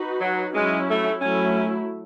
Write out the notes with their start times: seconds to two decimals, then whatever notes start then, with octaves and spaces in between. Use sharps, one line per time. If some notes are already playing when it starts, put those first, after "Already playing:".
Already playing: D#4 F#4 B4
0.21 F#3
0.54 F#3 G#3 C#4 E4
0.89 A3
1.21 F#3 A3 C#4 E4